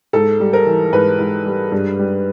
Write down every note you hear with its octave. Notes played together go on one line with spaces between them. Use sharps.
G#2 A4
G3
A#4
E3
G#2 B4
G#2
G3
G2
G3